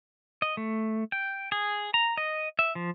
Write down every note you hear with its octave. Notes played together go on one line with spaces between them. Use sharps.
D#5
A3
G5
G#4
A#5
D#5
E5
F3